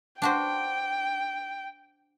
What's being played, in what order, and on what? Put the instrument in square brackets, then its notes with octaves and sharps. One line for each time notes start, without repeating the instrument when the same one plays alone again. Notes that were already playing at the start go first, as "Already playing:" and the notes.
[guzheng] D4 F#4 C5 [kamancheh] G5